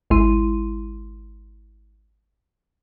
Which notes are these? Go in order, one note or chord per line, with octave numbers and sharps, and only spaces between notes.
G#1 C#2 G#3 E4 C6 D#7